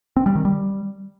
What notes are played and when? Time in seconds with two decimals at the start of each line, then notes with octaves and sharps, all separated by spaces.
0.17 C4
0.26 G3
0.35 D#3
0.45 G3